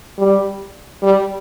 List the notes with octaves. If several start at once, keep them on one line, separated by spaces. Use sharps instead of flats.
G3
G3